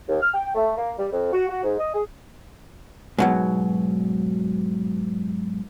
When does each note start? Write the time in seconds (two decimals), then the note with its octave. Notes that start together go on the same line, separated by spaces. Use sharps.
0.08 D#2
0.21 F6
0.34 G5
0.55 A3
0.77 A#3
0.98 G3
1.12 F2
1.32 F#4
1.49 F#4
1.63 G#2
1.79 D#5
1.94 G#4
3.18 G#2 B2 F#3